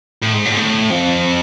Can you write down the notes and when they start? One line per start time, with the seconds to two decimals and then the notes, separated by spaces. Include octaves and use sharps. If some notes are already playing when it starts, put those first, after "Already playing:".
0.22 A2
0.34 G#2
0.45 A2
0.52 G#2
0.57 A2
0.90 F2